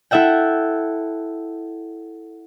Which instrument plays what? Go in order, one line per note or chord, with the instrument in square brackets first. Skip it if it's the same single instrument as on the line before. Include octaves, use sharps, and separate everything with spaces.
[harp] E4 A4 E5 F#5 G5